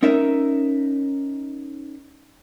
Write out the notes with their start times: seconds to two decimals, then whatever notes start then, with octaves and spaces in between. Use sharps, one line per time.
0.03 C#4 D#4 A#4 E5